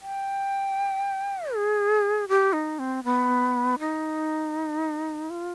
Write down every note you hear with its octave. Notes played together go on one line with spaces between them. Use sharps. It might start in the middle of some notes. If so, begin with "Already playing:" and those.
G5
G#4
G4
D#4
C4
B3
D#4
F4